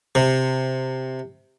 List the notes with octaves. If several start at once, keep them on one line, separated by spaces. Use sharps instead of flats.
C3